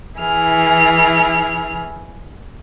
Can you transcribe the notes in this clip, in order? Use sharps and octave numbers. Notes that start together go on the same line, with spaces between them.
E3 E4 G#4 F6